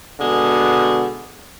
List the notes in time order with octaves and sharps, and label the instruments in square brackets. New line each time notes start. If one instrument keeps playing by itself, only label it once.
[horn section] B2 D3 G#3